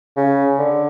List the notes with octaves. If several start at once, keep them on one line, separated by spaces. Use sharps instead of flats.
C#3
D3